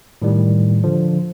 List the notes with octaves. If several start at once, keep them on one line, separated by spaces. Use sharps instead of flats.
A2 D#3 G3
D3 F3